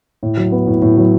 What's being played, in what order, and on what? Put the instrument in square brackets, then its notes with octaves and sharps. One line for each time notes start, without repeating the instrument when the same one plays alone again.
[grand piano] A2
F#3
B3
A2
A2
F#3